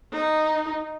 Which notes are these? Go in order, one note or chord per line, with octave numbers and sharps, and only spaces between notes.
D#4